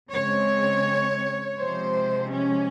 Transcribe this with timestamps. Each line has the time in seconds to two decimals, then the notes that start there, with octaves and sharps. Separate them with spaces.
0.12 C#3 G#3 C4 C#5
1.59 C3 F3 G#3 C5
2.32 C#4